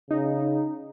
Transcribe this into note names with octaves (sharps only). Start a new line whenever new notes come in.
C#3 D#4